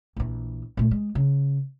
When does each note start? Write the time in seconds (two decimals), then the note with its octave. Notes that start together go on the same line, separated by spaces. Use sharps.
0.16 A#1 E3
0.77 A#2 A3
0.91 G#3
1.15 C#3